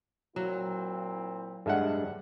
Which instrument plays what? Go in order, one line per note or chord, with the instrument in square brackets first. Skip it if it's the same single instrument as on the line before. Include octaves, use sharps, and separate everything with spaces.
[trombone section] A#2 C4 E4 [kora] F#3
[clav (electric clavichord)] G2 G#3 D4 [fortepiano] A4 E5 F#5